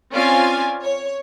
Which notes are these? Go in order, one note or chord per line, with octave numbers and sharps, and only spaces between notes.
C4 C#4 F4 D5 F5 G#5
C#5